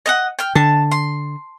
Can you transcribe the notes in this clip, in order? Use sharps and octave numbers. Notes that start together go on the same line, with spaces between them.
D#5 F5 F#5
G5 F6
D3 A5
C6